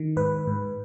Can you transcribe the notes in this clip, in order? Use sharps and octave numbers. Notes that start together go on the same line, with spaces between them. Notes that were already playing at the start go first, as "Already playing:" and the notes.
Already playing: D#3
G#2 B4
G#2